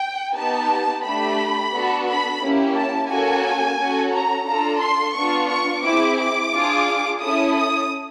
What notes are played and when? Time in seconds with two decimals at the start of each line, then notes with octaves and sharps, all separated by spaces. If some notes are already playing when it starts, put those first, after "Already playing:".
Already playing: G5
0.36 B3 D#4 G4 A5
1.05 A3 D4 G4 B5
1.73 B3 D4 F#4 A4
2.08 B5
2.42 A#3 C#4 E4 G4
2.76 A5
3.10 A#3 C#4 F#4 A4 G#5
3.78 C#4 F#4 A4
4.13 A#5
4.47 D4 F4 A4 A#5
4.82 C6
5.15 B3 D4 F4 C#6
5.50 C#6
5.84 C4 E4 G#4 D6
6.19 D6
6.53 D4 F4 G#4
7.21 C#4 E4 A4 D#6
7.56 D#6